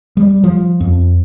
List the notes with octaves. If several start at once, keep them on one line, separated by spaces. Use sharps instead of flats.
G3
F3
F2